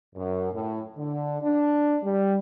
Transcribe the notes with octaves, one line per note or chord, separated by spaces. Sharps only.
F#2
A2
D3
D4
G3